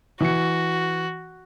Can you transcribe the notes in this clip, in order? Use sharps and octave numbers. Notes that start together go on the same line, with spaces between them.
E3 F#4 C#7